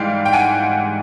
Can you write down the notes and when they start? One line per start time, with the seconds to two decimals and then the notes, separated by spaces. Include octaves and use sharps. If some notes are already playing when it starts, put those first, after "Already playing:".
Already playing: G#2 E3 G3 F5 G5
0.26 G5
0.33 F#5 G#5